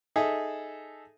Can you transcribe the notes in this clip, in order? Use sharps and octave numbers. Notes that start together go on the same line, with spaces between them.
D#4 G#4 A4 E5